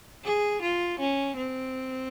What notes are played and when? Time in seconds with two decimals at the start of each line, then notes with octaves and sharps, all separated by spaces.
0.24 G#4
0.62 F4
0.99 C#4
1.36 C4